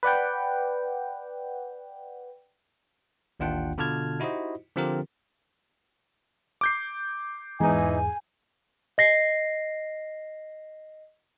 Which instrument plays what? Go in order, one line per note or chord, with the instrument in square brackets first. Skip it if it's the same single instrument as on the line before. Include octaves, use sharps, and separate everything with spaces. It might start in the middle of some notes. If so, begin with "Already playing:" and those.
[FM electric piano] B4 D5 F#5 G5
[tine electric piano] A1 D#2 D4 F4 F#5 G5
B2 D3 F4 A5 F6 G#6
D#4 E4 F#4 G4 C5 D#5
D3 F3 C4 F4 G4 A#4
[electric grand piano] D6 G6 C7
[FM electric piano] E2 G#2 G#4 [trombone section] E3 D#4 [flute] G#5
[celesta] D#5 A#6 C7